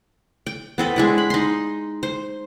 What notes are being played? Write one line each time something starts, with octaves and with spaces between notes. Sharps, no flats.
G5
B3 C4 A4 B4
G#3 D4 E4
B5
D#4 C6
C5